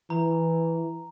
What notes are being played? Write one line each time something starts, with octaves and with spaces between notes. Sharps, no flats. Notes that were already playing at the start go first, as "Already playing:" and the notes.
E3 A#5